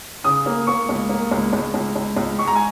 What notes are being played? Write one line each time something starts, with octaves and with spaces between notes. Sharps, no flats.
C#3 D#6
A#3
A#3 C#6
C#2
A#3
C#2
C#2
C#2
C#2
C#2
G#3 C#6
A#5
G#5